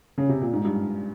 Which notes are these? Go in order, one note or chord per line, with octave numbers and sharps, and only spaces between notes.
C#3
C3
A#2
G#2
G2